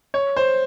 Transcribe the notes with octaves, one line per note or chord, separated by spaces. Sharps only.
C#5
C5